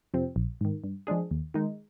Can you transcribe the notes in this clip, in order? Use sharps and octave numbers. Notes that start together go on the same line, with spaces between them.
F2 C3 F3 C4
A#1
G#2 D#3
G2
F3 G#3 D4 G#4
D#2
D#3 G#3 D#4